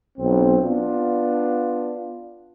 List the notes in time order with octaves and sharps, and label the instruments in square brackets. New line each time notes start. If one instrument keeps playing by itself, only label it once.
[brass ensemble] B1 C4
B3 D4 F4